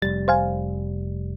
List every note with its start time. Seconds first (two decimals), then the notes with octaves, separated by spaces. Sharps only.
0.02 F1 G3 A6
0.28 C5 F5 G#5